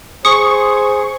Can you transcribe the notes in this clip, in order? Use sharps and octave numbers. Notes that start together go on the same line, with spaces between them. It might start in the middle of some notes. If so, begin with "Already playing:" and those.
G#4 C5 C#6 D#6